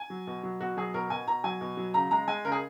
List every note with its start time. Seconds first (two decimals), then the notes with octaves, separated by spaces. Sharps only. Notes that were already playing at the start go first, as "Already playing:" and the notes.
Already playing: G#5
0.10 F#3
0.27 B2
0.43 F#3
0.61 B2 F#4
0.77 F#3 G#4
0.94 B2 A#4
1.10 B2 G#5
1.27 B2 A#5
1.44 F#3 G#5
1.61 B2
1.77 F#3
1.94 C#3 A#5
2.11 G#3 A#5
2.28 G#3 G#5
2.44 C#3 A#4
2.52 G#4